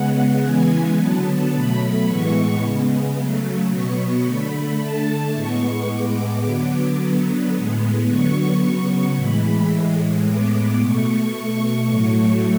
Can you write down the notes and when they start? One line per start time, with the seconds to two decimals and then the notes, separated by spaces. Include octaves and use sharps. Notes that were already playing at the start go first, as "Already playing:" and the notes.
Already playing: C#3 G#3 B3 F#5
0.43 C#3 E3 G#3 B3 G#5
0.97 D3 F#3 B3 A5
1.52 B2 F#3 A3 B5
2.07 A2 E3 G#3 B3 C#6
2.61 C#3 G#3 B3
3.16 C#3 F#3 A3
3.70 B2 F#3 B3 C#6
4.25 D3 A3 B5
4.79 D3 A3 A5
5.34 A2 G#3 B3 C#6
5.89 A2 G#3 B3 D6
6.44 D3 F#3 B3 D6
6.98 D3 F#3 B3
7.52 A2 G#3 B3
8.08 D3 F#3 B3 C#6
8.62 C#3 F#3 B3 C#6
9.16 A2 E3 G#3 B5
9.71 A2 E3 G#3
10.26 A2 G#3 B3 D6
10.80 B2 A3 C#6
11.34 B2 A3 C#6
11.89 A2 F#3 A3 C#6